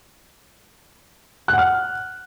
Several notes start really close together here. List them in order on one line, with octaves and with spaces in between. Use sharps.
F#6 F#5 F6